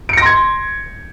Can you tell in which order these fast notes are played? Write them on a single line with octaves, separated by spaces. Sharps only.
D7 C#7 A#6 C6 G#6